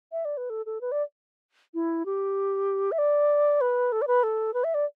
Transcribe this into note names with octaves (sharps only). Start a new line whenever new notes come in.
E5
D5
B4
A4
A4
B4
D5
E4
G4
E5
D5
B4
A4
D5
B4
A4
B4
E5
D5